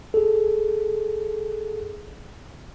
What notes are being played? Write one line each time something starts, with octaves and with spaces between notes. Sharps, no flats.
G#4 A4